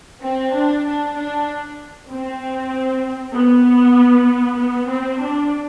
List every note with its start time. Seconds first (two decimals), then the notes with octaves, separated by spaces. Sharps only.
0.22 C4
0.53 D4
0.84 D4
1.15 D4
2.09 C4
3.34 B3
4.57 B3
4.88 C4
5.20 D4